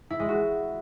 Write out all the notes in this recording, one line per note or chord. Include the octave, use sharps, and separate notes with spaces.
E4
G#3
F#4